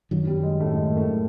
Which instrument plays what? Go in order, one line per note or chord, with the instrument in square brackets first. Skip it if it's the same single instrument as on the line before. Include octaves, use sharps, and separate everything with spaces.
[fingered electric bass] F#2 D#3 F#3
[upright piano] G3
G#3
A2 A3
A3
G#3
A#3
A2 A3